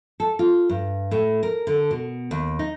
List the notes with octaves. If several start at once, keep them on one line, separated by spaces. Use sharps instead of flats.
A4
F4
G2
A2
A#4
D3
B2
D#2
D#4